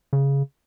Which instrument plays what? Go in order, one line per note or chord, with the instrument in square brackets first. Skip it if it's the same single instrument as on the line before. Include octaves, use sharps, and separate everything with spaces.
[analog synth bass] C#3